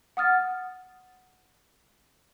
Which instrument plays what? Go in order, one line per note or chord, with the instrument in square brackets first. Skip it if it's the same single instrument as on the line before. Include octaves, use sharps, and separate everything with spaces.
[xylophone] F#5 D#6 F6 A6